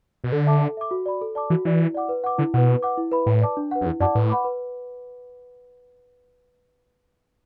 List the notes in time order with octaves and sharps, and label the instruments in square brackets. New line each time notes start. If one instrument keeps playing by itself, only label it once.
[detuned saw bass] B2
[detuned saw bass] D3 [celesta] A4
[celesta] E5 A5 D6
A4
E5 D6
F#4
D5 B5
A4
D5 A5 D6
[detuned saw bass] E3 [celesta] F#4
[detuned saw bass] E3 [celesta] B4 D5
[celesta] E4
D5 F#5 D6
B4
F#5 D6
[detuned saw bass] D3 [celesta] E4
[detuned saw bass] B2 [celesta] B4 F#5
[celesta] B4
F#5 D6
E4
B4 E5 B5
[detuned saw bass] A2 [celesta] B4
[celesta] D5 A5 D6
D4
B4 F#5
[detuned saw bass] F#2
[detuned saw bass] E2 [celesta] E4
[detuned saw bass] F#2 [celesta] D5 F#5 A5 D6
[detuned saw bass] A2 [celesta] B4
[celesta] F#5 B5 D6
B4